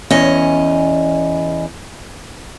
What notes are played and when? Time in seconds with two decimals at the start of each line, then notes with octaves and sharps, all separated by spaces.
0.10 E2 C#4 D#5